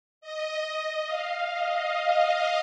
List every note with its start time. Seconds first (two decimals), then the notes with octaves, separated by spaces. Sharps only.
0.21 D#5
1.07 F5
1.50 D#5